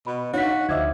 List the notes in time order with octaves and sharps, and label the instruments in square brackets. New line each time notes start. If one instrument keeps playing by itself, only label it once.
[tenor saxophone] B2 [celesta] B5
[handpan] D4 D#4 [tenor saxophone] F#4 [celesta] C#5 F5 B6
[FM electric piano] D2 D#5 E5 [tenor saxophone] F3 [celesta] D6 G#6